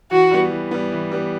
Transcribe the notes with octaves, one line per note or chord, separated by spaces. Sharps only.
E3 F#4
G3 B3
E3
G3 B3
E3
G3 B3